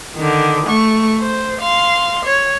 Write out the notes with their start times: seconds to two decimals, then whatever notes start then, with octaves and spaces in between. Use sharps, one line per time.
0.16 D3 D#3
0.66 A3 C#6
1.21 C5
1.61 F5 C6
2.25 C#5